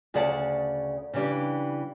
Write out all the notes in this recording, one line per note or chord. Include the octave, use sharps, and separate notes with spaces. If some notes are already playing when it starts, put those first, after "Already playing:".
D2 C#3 G#4 D5 F#5 A5
C#3 E3 G3 D4 G4